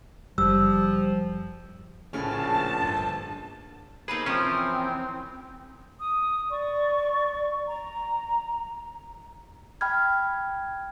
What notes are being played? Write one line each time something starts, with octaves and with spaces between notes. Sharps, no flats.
F#1 F3 G3 E6
A#1 A2 C#3 C#4 A5
G1
A#3 C4 D#4 G#4 B4
E3 F3 C4 C#4 A#4
D#6
D5 C#6
A#5
G5 B5 F6 G#6